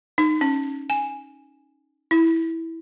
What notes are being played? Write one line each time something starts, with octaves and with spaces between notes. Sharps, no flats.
D#4
C#4
G#5
E4